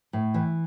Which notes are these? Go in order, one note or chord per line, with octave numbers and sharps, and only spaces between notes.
A2
E3